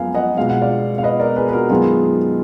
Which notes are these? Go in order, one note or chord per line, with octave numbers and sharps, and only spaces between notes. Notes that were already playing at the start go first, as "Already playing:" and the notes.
Already playing: F#2 F3 G#3 B3 F5 G#5
D#5 F#5
B2 G#3 B3 F5
F#5
D5 F5
F5
B4 D#5
A#4 D5
G#4 B4
B4
F#4 A#4
F#2 D#3 G#3 B3 F4 G#4